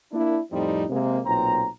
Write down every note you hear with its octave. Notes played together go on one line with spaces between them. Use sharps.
A#3 D4 E4
F2 A2 F3 G3 C4 D#4
C3 G#3 A#3
B1 A#2 C4 A#5